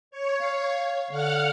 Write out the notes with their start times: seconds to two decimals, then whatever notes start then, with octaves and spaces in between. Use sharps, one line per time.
0.11 C#5
0.41 F5
1.11 D3 F5 F#5 F6